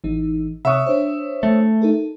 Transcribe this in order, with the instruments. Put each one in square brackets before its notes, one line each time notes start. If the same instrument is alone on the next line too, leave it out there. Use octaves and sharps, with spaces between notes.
[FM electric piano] A1 E3 D#4
[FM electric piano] C3 C#5 F#6 [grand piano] E5 C#6 D#6
[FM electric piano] D4 C5 C#5
[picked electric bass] A3
[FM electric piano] D#4 A4 A#4